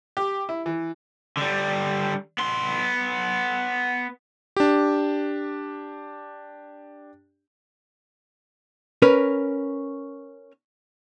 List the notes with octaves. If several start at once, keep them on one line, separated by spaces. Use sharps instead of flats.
G4
E4
E3
D3 G3
B3 C6
D4 G4
C#4 A#4 B4